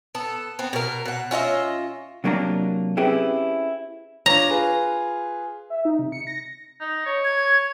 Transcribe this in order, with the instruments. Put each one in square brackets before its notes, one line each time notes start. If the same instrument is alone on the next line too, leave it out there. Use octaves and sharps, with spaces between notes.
[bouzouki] B3 A4
B3 C4
B2 A#4
B2 F#5
C#4 F4 D#5 E5
[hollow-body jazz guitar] C3 F#3 A#3 D4 F4 A#5
C4 C#4 E4 G4 G#4 B4
[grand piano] D4 F4 C#5 [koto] A#5
[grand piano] F4 G#4 B4
[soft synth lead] E5
D#4
C3
C#7
A#6
[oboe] D#4
C#5
[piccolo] G#6